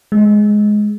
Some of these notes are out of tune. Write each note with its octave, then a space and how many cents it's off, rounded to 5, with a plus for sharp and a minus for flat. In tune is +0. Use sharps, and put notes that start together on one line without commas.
G#3 +10